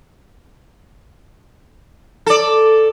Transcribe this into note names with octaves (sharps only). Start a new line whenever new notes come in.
A4 D5